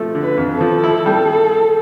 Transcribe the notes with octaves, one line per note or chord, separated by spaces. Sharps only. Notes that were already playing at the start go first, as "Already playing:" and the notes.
Already playing: F3 A3
D3
B4
F2
A4
F3
E4
G3